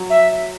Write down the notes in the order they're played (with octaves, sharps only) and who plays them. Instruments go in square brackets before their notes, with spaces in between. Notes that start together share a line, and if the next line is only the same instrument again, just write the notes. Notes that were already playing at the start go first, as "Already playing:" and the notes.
Already playing: [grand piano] F#3
[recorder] E5